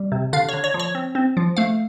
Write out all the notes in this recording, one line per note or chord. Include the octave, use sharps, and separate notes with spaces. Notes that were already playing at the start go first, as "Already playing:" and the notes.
Already playing: G3
C3
D3 F5
C#5
D3
C#5
F3
C#5
C4
C4
F3
A3 F5